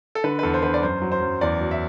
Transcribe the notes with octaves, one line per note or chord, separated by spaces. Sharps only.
A4
D3 B4
B4
E2 A4
C5
D3 B4
D5
F#2 C5
F#3
C5
F#2
E2 D5
F#3
E5